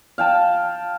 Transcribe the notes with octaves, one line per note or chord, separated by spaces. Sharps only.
F5 G5 A5